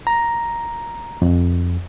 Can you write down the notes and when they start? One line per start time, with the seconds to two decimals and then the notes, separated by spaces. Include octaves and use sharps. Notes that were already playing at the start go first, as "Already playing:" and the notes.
0.07 A#5
1.22 F2